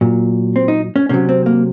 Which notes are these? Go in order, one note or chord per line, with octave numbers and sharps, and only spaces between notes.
A#2 F#3
C4
D#4
C#4
C3 F#3 C#4
C4
A#3